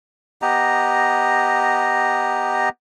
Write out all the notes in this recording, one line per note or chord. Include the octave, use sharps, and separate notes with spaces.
B3 G4 D#5 A#5